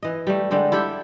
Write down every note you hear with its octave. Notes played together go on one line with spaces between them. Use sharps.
E3 D#5
G3 A3
D3 G3 G#3 D4
E4 G4 A4 G5